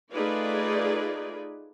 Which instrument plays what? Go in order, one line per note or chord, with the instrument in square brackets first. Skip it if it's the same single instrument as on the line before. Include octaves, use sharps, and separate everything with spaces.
[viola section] A3 D#4 F4 G#4 B4 D5